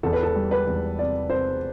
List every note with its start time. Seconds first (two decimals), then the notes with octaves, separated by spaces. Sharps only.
0.03 E2 A4
0.13 B4
0.23 A4
0.35 G3
0.51 B4
0.67 E2
0.99 C3 D5
1.30 C3 C5